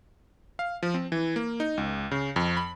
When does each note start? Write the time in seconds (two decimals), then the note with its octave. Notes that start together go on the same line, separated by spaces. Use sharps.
0.59 F5
0.83 F3
0.94 C4
1.12 E3
1.36 A#3
1.60 D#4
1.77 C#2
2.11 C#3
2.36 F2
2.57 B5